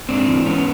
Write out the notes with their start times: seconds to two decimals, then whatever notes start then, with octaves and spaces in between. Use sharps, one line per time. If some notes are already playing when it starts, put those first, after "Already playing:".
0.09 G#2 C4 D4
0.28 E3
0.46 G#2 B3 C#4